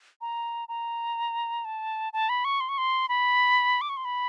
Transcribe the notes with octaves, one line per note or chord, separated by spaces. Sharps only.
A#5
A#5
A5
A5
B5
C#6
C6
C#6
C6
B5
D6
C#6
C6
B5